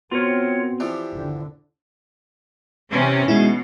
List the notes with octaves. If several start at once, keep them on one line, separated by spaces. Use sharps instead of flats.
B3 C4 F4 F#4 A#4 C#5
E3 F3 D4 G4
G1 D#2 D3
C3 E3 C#4
B2 G#3 D#4 E4